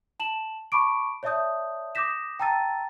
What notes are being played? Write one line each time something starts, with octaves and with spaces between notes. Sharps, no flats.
A5 E7 F#7
A5 B5 C#6 D6 D7
C#5 D5 E5 A5 D#6 G6
D6 D#6 G6 A#6 B6 E7
G5 A5 A#5 E6 A6 D#7